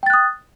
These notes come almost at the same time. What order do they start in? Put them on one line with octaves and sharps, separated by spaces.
G5 A6 F#6 D#6